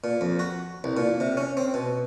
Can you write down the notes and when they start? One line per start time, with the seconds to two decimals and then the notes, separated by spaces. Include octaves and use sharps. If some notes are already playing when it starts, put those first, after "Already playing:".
0.04 A#2
0.21 F2
0.39 F#4
0.84 C2
0.97 A#2
1.20 C3
1.37 C#4
1.57 C4
1.74 B2